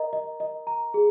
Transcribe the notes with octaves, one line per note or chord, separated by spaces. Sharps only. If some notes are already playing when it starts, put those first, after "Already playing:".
Already playing: A#4 D#5 A#5
D#5
D#5
A#5
G#4